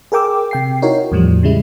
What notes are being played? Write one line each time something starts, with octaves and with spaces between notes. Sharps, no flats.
G#4 A#4 G5 D6 E6
C3 G5 C7
D#4 E4 F#4 A#4 C#5
E2 A2 F3 G3
C#3 G3 G#3 E4